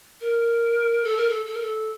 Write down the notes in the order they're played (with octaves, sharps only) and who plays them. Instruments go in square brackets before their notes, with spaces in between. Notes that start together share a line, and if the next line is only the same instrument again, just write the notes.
[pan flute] A#4
A4
A#4
A4
A4
A#4
A4